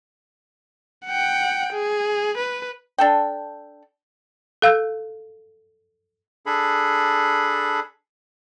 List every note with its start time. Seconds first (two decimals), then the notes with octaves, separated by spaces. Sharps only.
1.06 F#5 G5
1.73 G#4
2.38 B4
2.98 D4 A4 G5
4.62 A4 F5 E6 G6
6.46 D4 G#4 A4 B5